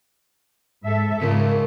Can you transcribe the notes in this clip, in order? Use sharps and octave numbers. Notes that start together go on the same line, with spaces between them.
G#2 A4 E5
C#2 G#2 C#3 A#4